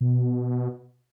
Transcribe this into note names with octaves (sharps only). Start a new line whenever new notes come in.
B2